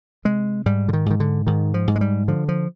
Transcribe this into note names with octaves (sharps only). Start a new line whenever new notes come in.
C3 G#3
G#2 G3
D3
D#3
G#2 D#3
D3
G#2 D#3
F3
G#2
G#3
G3
D3 F3
F3